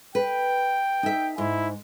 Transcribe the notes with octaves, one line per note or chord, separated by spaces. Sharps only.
B4 G5
D#4 E5
G#2 E4